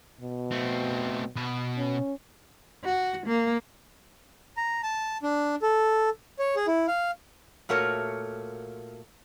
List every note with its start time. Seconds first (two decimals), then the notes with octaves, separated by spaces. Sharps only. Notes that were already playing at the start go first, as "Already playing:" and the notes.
0.21 B2
0.52 A3 C4
1.36 B2 B4
1.78 C#4
2.84 F#4
3.26 A#3
4.57 A#5
4.83 A5
5.23 D4
5.62 A4
6.39 C#5
6.56 G#4
6.67 E4
6.88 F5
7.69 A#2 A3 F#4 A#4 C#5